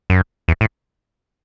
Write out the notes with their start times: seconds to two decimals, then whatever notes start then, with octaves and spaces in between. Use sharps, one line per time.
0.10 F#2
0.48 E2
0.61 A2